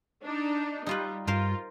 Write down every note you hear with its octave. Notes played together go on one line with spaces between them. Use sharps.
D4 D#4
G3 D#4 F4 B4
G2 F4 A#4 C5 F5